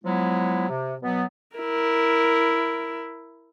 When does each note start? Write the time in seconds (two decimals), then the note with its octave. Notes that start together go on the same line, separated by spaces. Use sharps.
0.04 F3 F#3 G#3 B3 E4
0.69 C3
1.02 B2 F#3 B3
1.56 E4 A#4